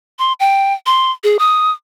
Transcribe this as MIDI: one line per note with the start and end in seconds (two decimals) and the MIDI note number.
0.19 0.33 84
0.40 0.73 79
0.86 1.11 84
1.24 1.37 68
1.39 1.71 87